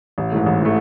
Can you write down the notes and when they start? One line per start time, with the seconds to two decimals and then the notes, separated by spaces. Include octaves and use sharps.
0.18 A1
0.32 G#2 E3 A3
0.46 A1
0.62 E3 A3